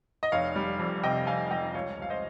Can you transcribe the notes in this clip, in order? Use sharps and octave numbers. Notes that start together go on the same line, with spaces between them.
D#5
F1 C#5 F5
G3
F2
C3 D#5 G5
F1 F5 G#5
G3 D#5 G5
C#2 C#5 F5
C#2 F5
C5 D#5